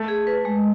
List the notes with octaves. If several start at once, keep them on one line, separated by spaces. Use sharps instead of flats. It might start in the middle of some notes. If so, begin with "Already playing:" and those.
Already playing: A3
G#4
B4
G#3